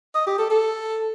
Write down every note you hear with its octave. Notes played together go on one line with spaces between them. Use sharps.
D#5
G4
A4
A4